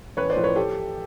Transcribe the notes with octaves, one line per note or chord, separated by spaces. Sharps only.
A1 B4 C#5
C5 D5
A2 F3
B4 C#5
G4 A4